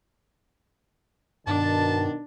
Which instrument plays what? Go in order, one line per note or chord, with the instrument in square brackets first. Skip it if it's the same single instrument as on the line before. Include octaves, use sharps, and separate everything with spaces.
[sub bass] G2 [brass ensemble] B2 D#3 [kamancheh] D4 [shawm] A5